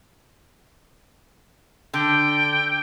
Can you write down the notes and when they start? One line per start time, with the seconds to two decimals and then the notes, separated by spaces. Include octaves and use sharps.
1.94 D3 G5